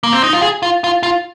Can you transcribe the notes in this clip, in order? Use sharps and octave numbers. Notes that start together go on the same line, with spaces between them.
A#3
C4
D#4
F4
G#4
F4
F4
F4